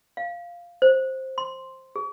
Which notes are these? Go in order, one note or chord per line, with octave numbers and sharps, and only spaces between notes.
F5
C5
C6
G#4